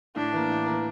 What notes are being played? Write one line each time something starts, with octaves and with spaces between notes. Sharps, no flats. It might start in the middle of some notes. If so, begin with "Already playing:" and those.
A2 D4
E3 A#3
A2
E3 A#3